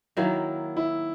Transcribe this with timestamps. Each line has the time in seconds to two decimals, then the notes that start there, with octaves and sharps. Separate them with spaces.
0.17 D#3 F#3 A#3 E4
0.77 E4